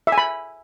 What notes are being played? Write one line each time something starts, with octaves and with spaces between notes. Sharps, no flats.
E5
G#5
B5